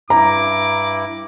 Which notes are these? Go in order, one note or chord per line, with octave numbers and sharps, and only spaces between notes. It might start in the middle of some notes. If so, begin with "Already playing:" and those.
G2 E4 A#5 D6